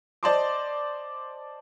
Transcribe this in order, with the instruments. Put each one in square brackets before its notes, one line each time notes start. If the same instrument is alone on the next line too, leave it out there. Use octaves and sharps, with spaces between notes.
[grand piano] C5 D5 D#5 A5 C6 D6